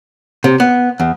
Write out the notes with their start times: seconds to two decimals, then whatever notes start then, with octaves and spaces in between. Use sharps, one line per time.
0.44 C3
0.60 B3
1.00 E2